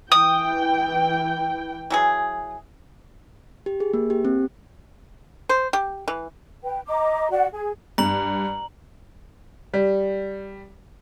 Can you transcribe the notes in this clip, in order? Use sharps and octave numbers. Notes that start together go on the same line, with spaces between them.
E3 G5 D#6
E3 F#3 G#4
G4
G#4
A#3
G4
C4
C5
G4
E3
B4 G5
D#5 A#5 D6
F#4 D5 F#5
G#4
G2 A#5 F#7
G3